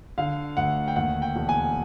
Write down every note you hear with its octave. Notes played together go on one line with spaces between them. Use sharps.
D3 F5
D2 F#5
G5
D#2 F#5
G5
E1
G#5